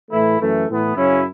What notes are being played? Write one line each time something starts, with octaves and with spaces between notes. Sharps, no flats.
A2 E3 A3 E4
F#2 E3 A3
A2 E3 B3
F#2 C#3 F#3 C#4 E4